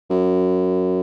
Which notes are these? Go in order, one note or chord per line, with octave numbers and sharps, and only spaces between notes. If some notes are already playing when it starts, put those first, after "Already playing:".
F#2